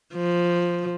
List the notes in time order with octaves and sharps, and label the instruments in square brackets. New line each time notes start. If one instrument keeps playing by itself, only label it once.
[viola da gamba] F3